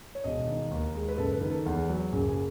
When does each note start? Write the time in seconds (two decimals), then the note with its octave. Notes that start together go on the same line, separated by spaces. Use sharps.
0.15 C#5
0.24 E1 D#5
0.47 D#3
0.71 D#2
0.95 G#3
1.08 B4
1.18 F#1 A4
1.34 B4
1.41 D#3
1.50 A4
1.65 E2 G#4
1.90 F#3
2.12 F#1 G#4
2.29 G#4